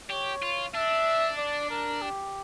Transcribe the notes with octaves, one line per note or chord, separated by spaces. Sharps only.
G4 C#5
F4
D4 E5
D5
A#4
G4